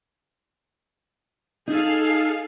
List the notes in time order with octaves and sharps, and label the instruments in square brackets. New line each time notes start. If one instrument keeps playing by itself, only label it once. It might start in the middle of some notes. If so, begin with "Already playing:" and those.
[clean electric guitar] D#4 [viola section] G#4 A4 F5